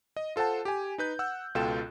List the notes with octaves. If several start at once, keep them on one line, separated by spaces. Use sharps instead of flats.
D#5
F4 A4 C5 F#5 A5
G4 G#5
D#4 B4 G6
F#5 E6 F#6
C#2 B2 F4 A4 G5 E7